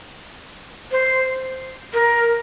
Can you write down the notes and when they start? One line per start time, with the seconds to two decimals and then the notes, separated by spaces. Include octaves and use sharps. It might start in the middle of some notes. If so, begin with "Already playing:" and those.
0.92 C5
1.94 A#4